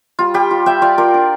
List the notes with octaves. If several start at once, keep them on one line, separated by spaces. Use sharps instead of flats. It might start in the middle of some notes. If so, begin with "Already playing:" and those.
G3 F4
G3 G4
F4
G3 E5 G5
F4 D5 F5
F4 A#4 D5
D4